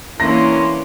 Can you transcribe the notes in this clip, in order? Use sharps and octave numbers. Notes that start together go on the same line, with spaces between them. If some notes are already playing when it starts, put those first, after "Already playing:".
E3 A#3 C#4 D4 C6 A#6